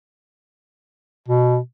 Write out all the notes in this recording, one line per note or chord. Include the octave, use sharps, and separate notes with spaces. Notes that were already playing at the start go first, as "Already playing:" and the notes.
B2